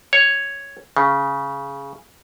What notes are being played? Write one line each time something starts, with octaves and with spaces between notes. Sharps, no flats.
C#5
C#3